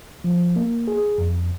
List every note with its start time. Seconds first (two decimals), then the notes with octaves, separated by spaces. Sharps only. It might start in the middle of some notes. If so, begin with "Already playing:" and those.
0.24 F3
0.56 A#3
0.88 G#4
1.18 F2